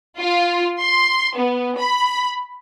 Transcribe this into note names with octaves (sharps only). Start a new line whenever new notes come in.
F4
C6
B3
B5